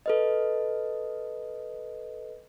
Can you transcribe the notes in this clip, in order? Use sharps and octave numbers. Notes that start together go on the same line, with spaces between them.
A4 B4 D#5